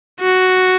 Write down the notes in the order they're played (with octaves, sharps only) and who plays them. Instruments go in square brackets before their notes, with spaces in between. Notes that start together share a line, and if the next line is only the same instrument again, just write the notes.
[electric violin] F#4